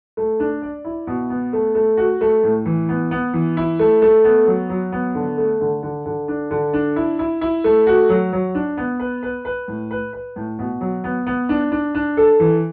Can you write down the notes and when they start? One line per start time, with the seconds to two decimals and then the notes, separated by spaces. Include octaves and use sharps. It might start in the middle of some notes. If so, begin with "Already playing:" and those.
0.17 A3
0.40 D4
0.62 D5
0.85 E4
1.07 B2
1.30 B3
1.53 A3
1.75 A3
1.97 F#4
2.21 A3
2.43 A2
2.66 E3
2.89 B3
3.11 B3
3.33 E3
3.57 E4
3.79 A3
4.02 A3
4.24 B3
4.47 F#3
4.69 F#3
4.92 B3
5.15 D3
5.38 A3
5.61 D3
5.83 D3
6.06 D3
6.28 D4
6.51 D3
6.73 D4
6.96 E4
7.19 E4
7.41 E4
7.64 A3
7.87 F#4
8.09 F#3
8.33 F#3
8.55 D4
8.77 B3
9.00 B4
9.23 B4
9.45 B4
9.68 A2
9.91 B4
10.13 B4
10.36 A2
10.59 B2
10.81 F#3
11.04 B3
11.27 B3
11.49 D4
11.72 D4
11.95 D4
12.17 A4
12.40 E3